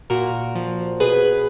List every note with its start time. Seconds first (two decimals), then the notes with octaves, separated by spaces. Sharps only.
0.10 A#2 F#4 A#4
0.55 F3
1.00 B2 G#4 B4